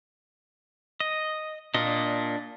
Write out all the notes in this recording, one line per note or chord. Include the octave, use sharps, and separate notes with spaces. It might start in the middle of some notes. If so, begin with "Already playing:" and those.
D#5
A#2 D4 D#5